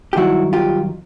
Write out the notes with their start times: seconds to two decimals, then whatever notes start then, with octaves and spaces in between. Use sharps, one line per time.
0.13 G4
0.16 G2 D#3 F#3 E4 F#4
0.53 F4 G4